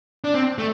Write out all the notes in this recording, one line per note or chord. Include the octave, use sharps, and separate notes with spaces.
D4
C4
A3